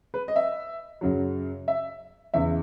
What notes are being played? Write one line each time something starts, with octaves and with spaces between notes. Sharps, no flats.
B4
D#5
E5
F#2 C#3 F#3
E5
E2 C#3 E3 E5